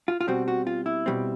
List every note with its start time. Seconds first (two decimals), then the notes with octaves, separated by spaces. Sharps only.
0.08 F4
0.21 F4
0.27 B2 G3 C4 F#4
0.48 F#4
0.67 F4
0.86 E4
1.06 B2 G3 C4